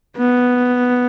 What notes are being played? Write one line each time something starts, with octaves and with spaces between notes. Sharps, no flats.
B3